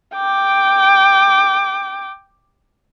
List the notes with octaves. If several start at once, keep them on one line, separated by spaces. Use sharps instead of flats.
G5 D6